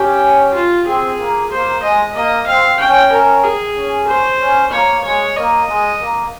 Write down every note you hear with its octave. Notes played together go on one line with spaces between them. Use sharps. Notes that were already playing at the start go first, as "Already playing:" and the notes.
Already playing: C#4 G4
F4
C4 G#4
A#3
A#3 C5
G#3 D#5
A#3 D#5
C4 F5
C#4 G5
A#4
G#4
C#4
C5
C#4
A#3 C#5
G#3 C#5
A#3 D#5
G#3
A#3